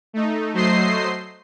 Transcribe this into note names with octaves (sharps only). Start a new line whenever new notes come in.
A3 D#4
F#3 A3 C5 D#5 C6 C7